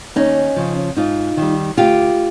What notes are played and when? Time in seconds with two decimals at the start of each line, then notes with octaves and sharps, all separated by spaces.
0.16 D#2 C#4 D#4
0.56 C#3 F3
0.96 G#2 D#4 F4
1.37 D#3 G3
1.77 D2 F4 G4